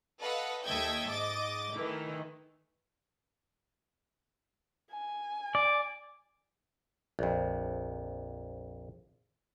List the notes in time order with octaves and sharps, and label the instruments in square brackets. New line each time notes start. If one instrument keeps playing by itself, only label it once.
[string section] A4 B4 D#5 F5 F#5
D#2 A4 D#5 E5 G5 G#6
G#2 D#5 D6 A6
D#3 E3 A3 E4
[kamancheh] G#5
[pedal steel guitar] D5 [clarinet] D6
[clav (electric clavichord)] A#1 F2